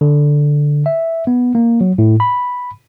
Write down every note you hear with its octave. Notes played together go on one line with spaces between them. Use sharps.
D3
E5
B3
A#3
F#3
A2
B5